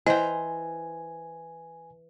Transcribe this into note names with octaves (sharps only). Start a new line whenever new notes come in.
E3 C5 D#5 G5 G#5 A#5